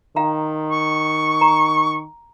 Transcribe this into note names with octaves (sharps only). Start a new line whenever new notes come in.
D#3 F5 G5 A#5
C#6
A#5